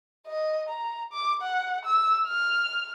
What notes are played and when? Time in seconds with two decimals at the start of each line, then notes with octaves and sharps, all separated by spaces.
0.27 D#5
0.69 A#5
1.13 D6
1.42 F#5
1.86 E6
2.27 F6